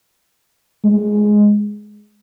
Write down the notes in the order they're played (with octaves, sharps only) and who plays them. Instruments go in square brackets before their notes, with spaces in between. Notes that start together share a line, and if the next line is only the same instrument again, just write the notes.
[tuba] G#3